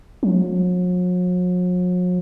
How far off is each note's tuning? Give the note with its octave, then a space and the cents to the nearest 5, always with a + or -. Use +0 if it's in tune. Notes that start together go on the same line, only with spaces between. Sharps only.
F#3 -45